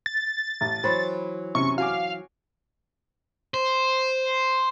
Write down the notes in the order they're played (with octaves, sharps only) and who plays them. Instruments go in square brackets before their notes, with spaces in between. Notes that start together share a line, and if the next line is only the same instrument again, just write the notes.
[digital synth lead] A6
[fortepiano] A1
[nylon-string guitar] E3 F#3 C5 [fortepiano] B5
[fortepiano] C3 C#4 [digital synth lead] C#6
[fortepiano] F#4 G#5 D6 [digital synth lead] F5
[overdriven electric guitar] C5